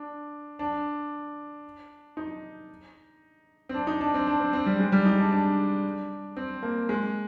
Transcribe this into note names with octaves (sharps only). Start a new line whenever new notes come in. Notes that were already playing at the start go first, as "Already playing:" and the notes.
Already playing: D4
D4
D#4
C4
D4
D#4
D4
C4
D4
C4
C4
G3
G#3
G3
D#4
D4
D4
C4
A#3
G#3